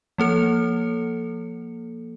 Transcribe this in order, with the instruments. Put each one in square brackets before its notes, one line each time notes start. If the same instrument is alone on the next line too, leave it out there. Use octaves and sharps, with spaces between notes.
[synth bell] F3 A#3 A4 C#7